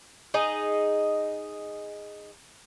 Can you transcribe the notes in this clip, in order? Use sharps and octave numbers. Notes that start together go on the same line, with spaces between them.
D#4 G#4 D#5